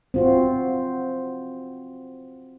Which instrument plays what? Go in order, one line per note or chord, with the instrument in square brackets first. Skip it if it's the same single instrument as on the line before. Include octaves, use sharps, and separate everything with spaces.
[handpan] C4 F4 F#4